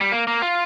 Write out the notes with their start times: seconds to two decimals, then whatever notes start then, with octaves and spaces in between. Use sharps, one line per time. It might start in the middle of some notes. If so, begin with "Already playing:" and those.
0.01 G3
0.11 A#3
0.27 A#3
0.42 F4